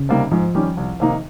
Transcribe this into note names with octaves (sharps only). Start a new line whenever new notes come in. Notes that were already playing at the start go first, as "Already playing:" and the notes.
Already playing: C#3
C3 G3 A#3 D#4
G#2 F3
D#3 G3 C#4 G4
C2
C3 D#3 A#3 D#4